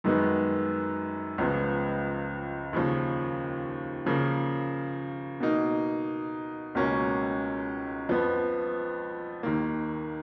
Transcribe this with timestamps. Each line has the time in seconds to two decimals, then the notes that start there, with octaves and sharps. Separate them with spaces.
0.04 F#2 D#3 G#3 B3
1.38 C#2 C#3 F3 B3
2.73 D#2 C#3 F3
4.06 C#3 F3 A#3
5.40 B2 A#3 D#4
6.75 C#2 B2 A#3 C#4
8.09 F2 F3 B3
9.43 D#2 D#3 A#3